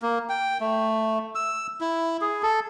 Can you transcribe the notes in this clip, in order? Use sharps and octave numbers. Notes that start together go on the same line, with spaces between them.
A#3
G5
A3
E6
E4
G#4
A4